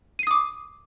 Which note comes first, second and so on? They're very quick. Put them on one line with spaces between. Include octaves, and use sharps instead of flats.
D#7 C7 D#6 D6